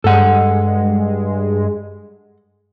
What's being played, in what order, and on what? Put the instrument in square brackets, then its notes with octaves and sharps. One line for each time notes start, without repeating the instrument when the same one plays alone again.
[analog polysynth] G2 G#3 [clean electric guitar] A4 F#5